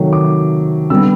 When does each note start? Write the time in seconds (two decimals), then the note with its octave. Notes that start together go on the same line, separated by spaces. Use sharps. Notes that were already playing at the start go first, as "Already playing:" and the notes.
Already playing: C3 D#3 F#3 A3
0.13 D6
0.90 D3 G3 B3 E6